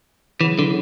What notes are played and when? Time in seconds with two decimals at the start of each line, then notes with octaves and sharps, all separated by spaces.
0.41 C#3 E3 F#3 B3 E4
0.59 D3